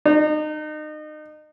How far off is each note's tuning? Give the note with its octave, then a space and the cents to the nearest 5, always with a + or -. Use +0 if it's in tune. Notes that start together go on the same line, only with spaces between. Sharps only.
D#4 -30